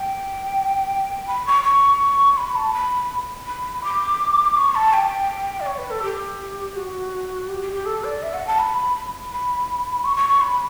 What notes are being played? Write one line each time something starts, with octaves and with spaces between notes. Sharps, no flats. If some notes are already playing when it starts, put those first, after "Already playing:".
Already playing: G5
B5
C#6
C#6
B5
A5
B5
B5
D6
C#6
A5
G5
D5
C#5
B4
A4
G4
F#4
G4
G4
G4
A4
D5
E5
F#5
A5
B5
B5
C#6
C#6
C#6
B5